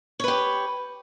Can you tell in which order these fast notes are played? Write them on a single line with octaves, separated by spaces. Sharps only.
C#5 B4 G4